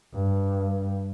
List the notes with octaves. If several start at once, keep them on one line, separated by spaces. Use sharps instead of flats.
G2